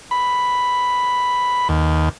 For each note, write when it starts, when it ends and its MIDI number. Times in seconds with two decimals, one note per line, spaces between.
0.11 1.68 83
1.69 2.09 39